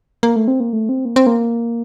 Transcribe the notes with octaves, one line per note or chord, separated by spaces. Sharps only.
A#3
A3
C4
A#3
A3
C4
A#3
C4
A#3